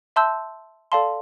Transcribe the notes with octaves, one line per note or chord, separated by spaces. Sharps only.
E5 A5 C6 E6 G6
A4 D5 F5 A5 C6